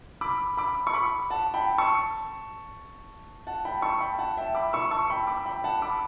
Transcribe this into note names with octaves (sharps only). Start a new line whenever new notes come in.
B5 D6
B5 D6
C#6
B5 D6
F#5 A5
G5 B5
A5 C#6
F#5 A5
G5 B5
A5 C#6
G5 B5
F#5 A5
E5 G5
B5 D6
C#6 E6
A5 C#6
G5 B5
B5 D6
G5 B5
F#5 A5
B5 D6